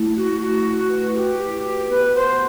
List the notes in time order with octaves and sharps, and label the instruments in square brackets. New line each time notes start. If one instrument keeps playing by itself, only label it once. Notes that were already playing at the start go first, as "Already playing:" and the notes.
Already playing: [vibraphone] A3 E4
[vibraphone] A3 [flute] F#4
[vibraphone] A3 [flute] F#4
[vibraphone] E4
B4
[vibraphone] F#4 [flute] G4
[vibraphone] B4
F#4
[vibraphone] B3 [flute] B4
[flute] C5 [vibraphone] F#5